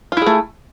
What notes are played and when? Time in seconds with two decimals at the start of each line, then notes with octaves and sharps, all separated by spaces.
0.12 F4
0.17 E4
0.22 G#4
0.26 A3